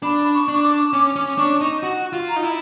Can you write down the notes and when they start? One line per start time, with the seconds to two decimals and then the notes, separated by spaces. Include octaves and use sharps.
0.03 D4 B5
0.33 C#6
0.48 D4
0.53 C#6
0.63 D6
0.93 C#4 D6
1.16 C#4
1.38 D4 C#6
1.61 D#4
1.83 F#4
2.13 F4
2.28 A#5
2.36 D#4
2.43 E4